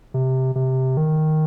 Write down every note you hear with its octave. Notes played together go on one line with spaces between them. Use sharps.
C3
C3
D#3